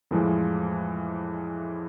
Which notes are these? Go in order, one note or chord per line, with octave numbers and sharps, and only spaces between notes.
F2 A2 E3 F3 G#3